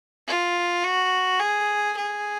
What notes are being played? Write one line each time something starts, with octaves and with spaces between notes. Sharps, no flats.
F4
F#4
G#4
G#4